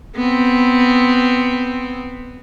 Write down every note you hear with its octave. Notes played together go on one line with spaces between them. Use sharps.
B3 C4